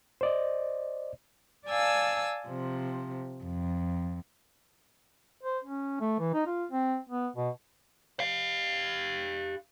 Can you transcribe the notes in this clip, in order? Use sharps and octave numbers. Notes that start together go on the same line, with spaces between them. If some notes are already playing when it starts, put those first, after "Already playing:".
C5 D5 D#5
D5 F5 G#5 A5 E6
C3 F3
F2
C5
C#4
A3
E3
D#4
F4
C4
B3
B2
G4 F5